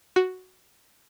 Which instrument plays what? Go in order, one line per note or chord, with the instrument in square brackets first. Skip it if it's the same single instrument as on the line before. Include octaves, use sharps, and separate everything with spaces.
[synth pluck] F#4